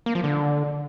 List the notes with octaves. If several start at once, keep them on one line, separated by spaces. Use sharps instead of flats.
A#3
F3
D3